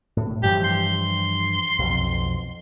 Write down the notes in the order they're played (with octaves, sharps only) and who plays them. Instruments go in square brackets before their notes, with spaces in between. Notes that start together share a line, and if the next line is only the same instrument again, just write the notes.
[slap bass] A2
[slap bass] G2 E3 F3 [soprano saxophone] G4
[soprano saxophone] C6
[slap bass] B1 F2